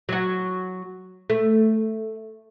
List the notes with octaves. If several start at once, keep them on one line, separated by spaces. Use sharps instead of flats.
F#3 F#4
A3